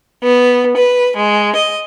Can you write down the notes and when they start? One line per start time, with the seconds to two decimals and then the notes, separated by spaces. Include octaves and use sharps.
0.24 B3
0.77 B4
1.16 G#3
1.56 D#5